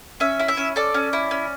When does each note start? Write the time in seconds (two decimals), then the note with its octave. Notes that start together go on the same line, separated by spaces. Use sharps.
0.20 C#4 E5
0.39 E4
0.48 E5
0.57 C#4
0.76 A4 D5
0.94 C#4
1.13 E4
1.31 C#4